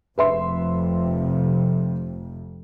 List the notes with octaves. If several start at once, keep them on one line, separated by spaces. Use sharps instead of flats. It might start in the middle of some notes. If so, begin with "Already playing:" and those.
F1 F2 C3 B4 E5 C6